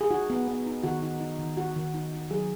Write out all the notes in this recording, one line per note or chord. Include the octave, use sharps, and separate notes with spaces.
G#4
D#4 F#4
B3
B3
D#4
D#3 F#4
D#4
D#4
D#3
D#4 F#4
D#3
D#4
D#4
F#3 G#4